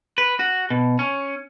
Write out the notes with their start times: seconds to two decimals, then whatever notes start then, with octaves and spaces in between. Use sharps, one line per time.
0.18 B4
0.39 F#4
0.70 B2
0.99 C#4